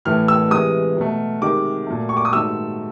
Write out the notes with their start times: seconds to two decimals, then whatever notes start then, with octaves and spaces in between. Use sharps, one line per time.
0.05 A2 E3 A3 F6
0.28 E6
0.51 C3 E3 G#3 D#6
0.97 B2 F#3 A3
1.41 C3 D#3 G#3 D6
1.87 A#2 F#3 A3
2.09 C#6
2.17 D6
2.25 D#6
2.32 G#2 D#3 F#3 A3 E6